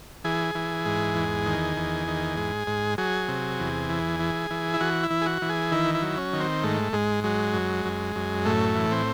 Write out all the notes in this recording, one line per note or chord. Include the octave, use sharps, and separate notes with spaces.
E3 G#4
E3
G#2
E2
D#3
E2
D#3
G#2
G#2
F#3 G#4
C3
E2
E3
E3
E3
E4
E3 F#4
E4
E3
G#4
F#4
E3
G#4
D#3 E4
E4
F#3
C#4
D#3
C4
G#2 A3
G#2 G#3
F#3 G#3
F#2
F#2
F#2
A2 A3
E3
C4